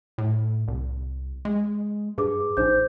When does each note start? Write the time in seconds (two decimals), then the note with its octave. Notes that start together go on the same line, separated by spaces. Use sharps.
0.18 A2
0.68 C2
1.45 G#3
2.18 G2 G#4 B4 D6
2.57 A#1 D#4 C5 G6